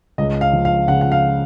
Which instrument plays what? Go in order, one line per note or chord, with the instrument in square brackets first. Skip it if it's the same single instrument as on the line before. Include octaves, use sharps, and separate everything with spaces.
[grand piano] C#2 [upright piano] D#5
[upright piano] F5
[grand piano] F3
[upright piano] F5
[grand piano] C#3 [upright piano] F#5
[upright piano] F#5
F5